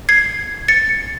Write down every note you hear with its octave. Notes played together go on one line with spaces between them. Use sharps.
G#6 C7
A6 C#7